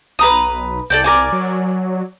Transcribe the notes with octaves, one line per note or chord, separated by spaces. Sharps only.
B1 B4 A#5 D#6
C2 A4 D5 G5
A#4 D5 G#5
F#3